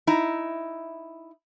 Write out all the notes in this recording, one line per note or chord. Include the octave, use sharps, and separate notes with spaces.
D#4 E4 A#5